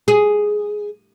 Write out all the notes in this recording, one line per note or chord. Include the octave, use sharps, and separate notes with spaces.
G#4